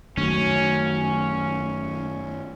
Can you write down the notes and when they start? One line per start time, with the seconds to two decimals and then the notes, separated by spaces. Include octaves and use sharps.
0.17 F#2 D#3 F#3 A3 C#4